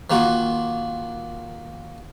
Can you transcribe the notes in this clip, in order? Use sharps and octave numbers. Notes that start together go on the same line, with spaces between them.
D#3 A#3 F4 F#4